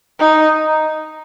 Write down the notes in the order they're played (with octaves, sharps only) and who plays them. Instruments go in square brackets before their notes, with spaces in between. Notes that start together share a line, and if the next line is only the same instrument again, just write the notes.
[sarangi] D#4